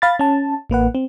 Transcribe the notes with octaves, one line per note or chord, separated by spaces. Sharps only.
F5 B5 A6
C#4 A5
A1 A#3 B4 F#5
C4